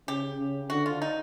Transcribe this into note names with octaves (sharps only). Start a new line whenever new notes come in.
C#3 G4
C#3
D3 F#4
F4
D#4